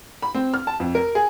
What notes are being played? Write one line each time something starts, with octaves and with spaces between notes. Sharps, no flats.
B5
C4
F6
A5
F2
A#4
G#4